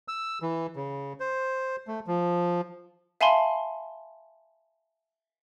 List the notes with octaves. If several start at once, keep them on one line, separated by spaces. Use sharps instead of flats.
E6
E3
C#3
C5
A3
F3
E5 F5 G#5 A5 B5 C6